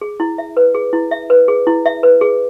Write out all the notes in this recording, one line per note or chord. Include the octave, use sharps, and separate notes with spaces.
G#4
E4
E5
B4
G#4
E4
E5
B4
G#4
E4
E5
B4
G#4